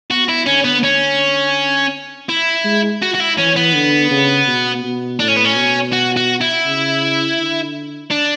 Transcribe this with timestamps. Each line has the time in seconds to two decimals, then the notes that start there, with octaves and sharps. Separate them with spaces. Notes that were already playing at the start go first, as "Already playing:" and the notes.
0.11 B3 F#4
0.29 E4
0.46 D3 C#4
0.64 B3
0.84 C#4
2.29 E4
2.65 G#3
3.02 F#4
3.14 F#4
3.20 E4
3.38 E3 C#4
3.56 B3
3.74 D3
4.11 C#3
4.47 B2
4.84 B2
5.20 A2 D4
5.28 C#4
5.37 B3
5.45 C#4
5.56 B2
5.93 F#4
6.17 F#4
6.41 E4
6.65 C#3
7.38 D3
8.11 D4